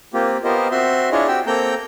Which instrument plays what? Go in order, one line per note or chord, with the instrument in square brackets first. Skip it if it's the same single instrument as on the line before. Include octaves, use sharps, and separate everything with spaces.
[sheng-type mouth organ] A#3 C4 F4 G4
B3 F4 G4 A#4 C5 D#5
C4 F#4 E5 C6
D4 E4 F4 G#4 C#5 D#5
C4 F#4 G4 G5 E6
A#3 C4 A4 G5 A#5 G6